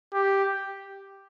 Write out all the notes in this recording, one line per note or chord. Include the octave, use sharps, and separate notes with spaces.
G4